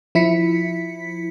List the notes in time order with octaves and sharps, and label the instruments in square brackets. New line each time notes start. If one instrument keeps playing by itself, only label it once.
[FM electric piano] F3 E4 B6 C#7